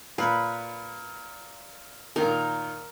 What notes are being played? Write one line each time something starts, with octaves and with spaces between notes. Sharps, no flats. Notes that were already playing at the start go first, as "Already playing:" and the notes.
A#2 B4
A#2 D#3 D#4 A#4